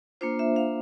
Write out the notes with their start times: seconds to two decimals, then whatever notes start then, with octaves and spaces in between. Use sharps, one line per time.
0.21 A#3 D4 F4 C5
0.39 E5
0.56 F5